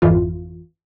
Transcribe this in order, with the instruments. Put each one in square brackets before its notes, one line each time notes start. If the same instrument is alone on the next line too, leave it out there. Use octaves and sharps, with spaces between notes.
[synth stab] G#1 F2 E3 F4